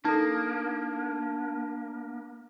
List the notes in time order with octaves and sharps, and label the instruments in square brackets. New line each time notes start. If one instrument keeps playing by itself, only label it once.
[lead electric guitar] A#3 [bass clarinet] D4 [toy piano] D#4 A4